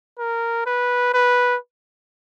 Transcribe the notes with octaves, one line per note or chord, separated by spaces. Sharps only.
A#4
B4
B4